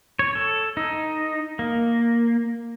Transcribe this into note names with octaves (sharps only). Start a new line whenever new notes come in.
C#5
A4
D#4
A#3